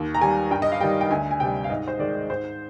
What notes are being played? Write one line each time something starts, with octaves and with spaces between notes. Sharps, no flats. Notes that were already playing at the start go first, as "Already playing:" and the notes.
Already playing: D#2
A#5
D#3 G3 G#5
G2 G5
D#5
F5
D#3 G3 G5
G5
D2 G#5
G#5
C3 G3 G5
F5
G#2 D#5
C5
D#3 G#3 D5
G#2 C5